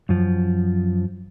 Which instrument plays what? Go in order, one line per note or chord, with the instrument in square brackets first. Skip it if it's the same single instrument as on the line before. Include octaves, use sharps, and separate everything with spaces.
[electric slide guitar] F#2 F3